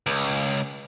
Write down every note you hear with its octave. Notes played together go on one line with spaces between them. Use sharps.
C#2